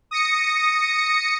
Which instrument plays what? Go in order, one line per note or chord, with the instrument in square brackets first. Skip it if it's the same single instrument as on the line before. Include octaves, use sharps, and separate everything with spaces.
[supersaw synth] D#6 A#6 C#7